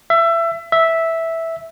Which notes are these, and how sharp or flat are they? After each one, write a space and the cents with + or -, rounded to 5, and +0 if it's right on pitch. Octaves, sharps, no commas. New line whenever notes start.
E5 +25
E5 -5